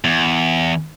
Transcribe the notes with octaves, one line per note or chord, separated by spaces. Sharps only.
E2